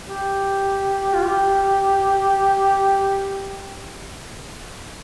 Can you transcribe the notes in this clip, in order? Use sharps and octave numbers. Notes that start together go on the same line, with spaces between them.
G4
F4
G4